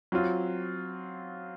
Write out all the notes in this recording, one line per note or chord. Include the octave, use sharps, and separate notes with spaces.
F#3 C4 F4